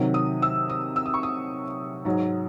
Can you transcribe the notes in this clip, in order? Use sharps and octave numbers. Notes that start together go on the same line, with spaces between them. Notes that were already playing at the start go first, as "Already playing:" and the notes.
Already playing: C3 D#3 F#3
D#6
E6
D#6
E6
D#6
C#6
D#6
G#2 F#3